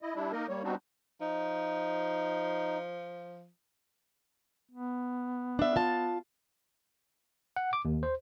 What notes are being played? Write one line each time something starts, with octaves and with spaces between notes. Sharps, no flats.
E4 D#5
G3 D4 E4
A#3 D#4 A#4 D#5
G3 A#3 C#5
G3 B3 C4 D4 D#4 F#4
F3 D#4
B3
D4 E5
F4 A5
F#5
D6
D#2
C5